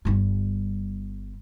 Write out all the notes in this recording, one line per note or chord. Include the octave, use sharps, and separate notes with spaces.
G1 G3